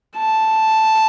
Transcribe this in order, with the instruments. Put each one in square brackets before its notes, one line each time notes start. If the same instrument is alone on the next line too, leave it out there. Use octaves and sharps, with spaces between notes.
[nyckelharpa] A5